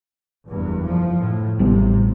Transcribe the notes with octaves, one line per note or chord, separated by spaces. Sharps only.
F#1 E2 G2
F3
A2
A1 C3 G3 B3